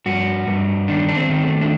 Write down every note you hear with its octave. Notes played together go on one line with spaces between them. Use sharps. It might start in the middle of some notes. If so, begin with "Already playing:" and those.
G2 F#4
G2
D#3 D4
D4
C4
D#3
A3
D4